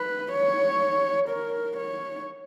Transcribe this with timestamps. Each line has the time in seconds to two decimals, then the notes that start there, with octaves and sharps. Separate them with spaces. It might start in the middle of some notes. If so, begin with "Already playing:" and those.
Already playing: B4
0.32 C#5
1.29 A#4
1.77 C#5